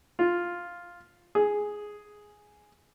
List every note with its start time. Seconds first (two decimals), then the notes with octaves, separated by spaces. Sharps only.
0.19 F4
1.35 G#4